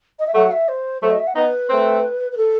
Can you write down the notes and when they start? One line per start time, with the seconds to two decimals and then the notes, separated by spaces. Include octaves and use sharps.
0.19 D#5
0.27 E5
0.34 F#3 A3 F#5
0.52 E5
0.68 C5
1.02 F#3 A3 C5
1.10 D#5
1.19 E5
1.27 F#5
1.35 B3 D#4 B4
1.69 A3 C4
2.32 B4
2.37 A4